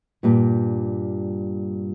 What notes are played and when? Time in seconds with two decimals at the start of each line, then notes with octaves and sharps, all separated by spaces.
0.23 G2 A#2 G3